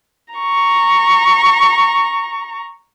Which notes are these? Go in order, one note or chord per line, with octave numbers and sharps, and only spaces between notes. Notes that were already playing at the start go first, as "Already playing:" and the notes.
A#5 C#6